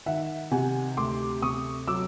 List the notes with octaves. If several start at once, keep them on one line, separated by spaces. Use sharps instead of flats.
D#3 E5 F#5
C3 F#5 G#5
D2 C6 D6
C3 C#6 D#6
F#3 D6 E6